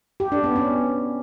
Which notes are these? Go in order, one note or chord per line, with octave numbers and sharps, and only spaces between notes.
G4
D4
B3
C#4